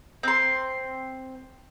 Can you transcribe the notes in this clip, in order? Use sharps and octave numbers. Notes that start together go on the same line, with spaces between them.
C4 C6